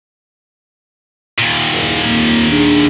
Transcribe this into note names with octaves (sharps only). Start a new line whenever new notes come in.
D#2 A#2
F#1
F2 A#3
D4 G#4